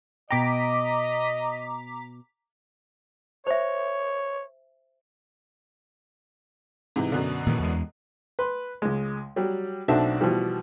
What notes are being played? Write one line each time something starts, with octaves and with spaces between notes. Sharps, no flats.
B2 D#5 G5 A#5 D6 B6
C5 C#5 E5
G#2 C3 E3
F#2 B2 D3
A#2 D#3 E3
E2 G#3
B4 B5 C6
C#2 G#3
F#3 G3
B1 C4 D4 F#4 A4 E5
B2 E3 F3 G3